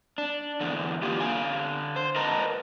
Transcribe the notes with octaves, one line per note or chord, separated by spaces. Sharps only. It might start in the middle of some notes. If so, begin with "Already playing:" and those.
D4
E2 D3
A#3 F4 G4
D3 F5 G#5
C5
A#4 B4 D#5 F#5 A5 A#5